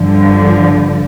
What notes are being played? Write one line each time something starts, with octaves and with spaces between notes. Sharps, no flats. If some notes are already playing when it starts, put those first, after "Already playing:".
Already playing: G2 D3 F3